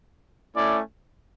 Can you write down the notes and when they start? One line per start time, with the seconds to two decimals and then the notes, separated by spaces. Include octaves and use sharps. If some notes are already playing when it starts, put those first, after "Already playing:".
0.55 A3 C#4 E4 D5